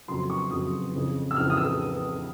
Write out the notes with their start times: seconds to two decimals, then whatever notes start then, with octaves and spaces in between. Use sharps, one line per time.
0.08 F2 C#3 F#3 C6
0.30 C#6
0.50 F2 C#3 F#3 D#6
0.93 F2 C#3 E3
1.31 E6
1.36 F2 C#3 E3 F6
1.50 D#6
1.57 E6